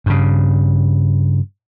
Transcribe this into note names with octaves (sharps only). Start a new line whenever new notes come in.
G2 C#3